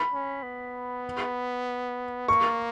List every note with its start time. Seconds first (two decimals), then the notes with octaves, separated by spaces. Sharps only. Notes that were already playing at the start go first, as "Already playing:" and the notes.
Already playing: B5
0.13 C#4
0.43 B3
2.28 A#3 C#6